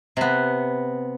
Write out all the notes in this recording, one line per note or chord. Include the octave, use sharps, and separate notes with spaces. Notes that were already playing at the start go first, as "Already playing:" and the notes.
C3 B3